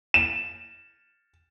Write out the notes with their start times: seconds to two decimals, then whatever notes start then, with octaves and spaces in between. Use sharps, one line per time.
0.14 E7